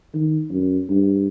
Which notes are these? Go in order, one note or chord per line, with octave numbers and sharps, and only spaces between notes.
D#3
F#2
G2